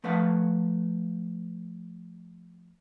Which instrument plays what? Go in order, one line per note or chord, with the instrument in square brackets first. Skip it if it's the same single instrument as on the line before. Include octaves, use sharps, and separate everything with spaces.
[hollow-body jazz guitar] F3 A3 B4 F5 F#5